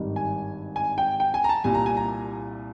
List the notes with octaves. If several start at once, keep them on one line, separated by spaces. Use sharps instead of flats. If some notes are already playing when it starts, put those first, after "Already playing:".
Already playing: G#1 G2 D#3 G3
G#5
G#5
G5
G5
G#5
A#5
A5
C2 A#2 G3 G#5
A#5
G#5
A#5